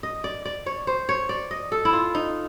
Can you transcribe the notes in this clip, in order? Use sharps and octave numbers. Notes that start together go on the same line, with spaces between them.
D#5
D5
D5
C#5
C5
C#5
D5
D#5
A4
E4
F4
D#4